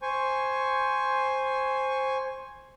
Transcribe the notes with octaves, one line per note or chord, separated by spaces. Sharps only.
C5 G#5 C#6